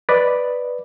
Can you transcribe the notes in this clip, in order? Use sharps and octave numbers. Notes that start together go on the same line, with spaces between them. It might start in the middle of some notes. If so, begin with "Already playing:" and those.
B4 D5 D#5